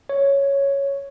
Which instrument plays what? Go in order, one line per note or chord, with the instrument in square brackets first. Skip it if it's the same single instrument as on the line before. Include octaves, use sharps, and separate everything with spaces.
[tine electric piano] C#5